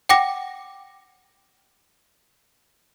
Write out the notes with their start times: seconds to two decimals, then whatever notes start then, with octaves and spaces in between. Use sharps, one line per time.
0.09 F#5 G5 D6 A#6